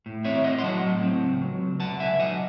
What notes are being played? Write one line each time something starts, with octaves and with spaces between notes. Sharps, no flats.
A2
C4 C#5 E5
A2 D#5 F#5
C6
F#3 F#5 A5
A2
C4
C#2
F#3
C#2
C3 F#5 A5
C#2 E5 G#5
F#3 D#5 F#5